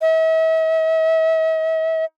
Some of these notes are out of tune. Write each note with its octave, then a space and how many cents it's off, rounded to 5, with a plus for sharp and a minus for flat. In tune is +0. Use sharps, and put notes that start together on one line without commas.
E5 -45